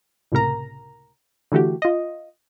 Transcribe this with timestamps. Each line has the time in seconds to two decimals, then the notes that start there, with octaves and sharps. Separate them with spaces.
0.32 C#2 A2 C3 A#4 A#5
1.52 D3 E3 A3 F#4 G4
1.82 F4 D#5